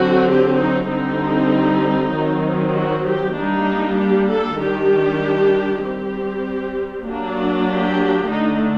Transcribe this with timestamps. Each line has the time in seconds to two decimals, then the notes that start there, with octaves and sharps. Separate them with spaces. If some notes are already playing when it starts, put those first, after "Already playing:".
Already playing: D3 F#3 C4 F#4
0.28 G4
0.59 D#4
0.89 D3 G3 C4 D#4
2.14 D#3 F#3 C4
2.75 F#4
3.06 G4
3.36 G3 A#3 D4 D#4
3.98 G4
4.29 A4
4.60 D#3 G3 D4 G4
5.83 G3 C4 G4
7.07 F#3 A#3 D4
7.68 G4
8.30 D3 A3 D4 D#4